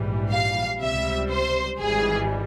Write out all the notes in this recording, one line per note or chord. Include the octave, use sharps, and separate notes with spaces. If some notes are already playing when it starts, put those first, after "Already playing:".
Already playing: A#1 G#2 E3 G3
F5
C#2 C3 G3 E5
C5
G#1 G#2 E3 G3 G#4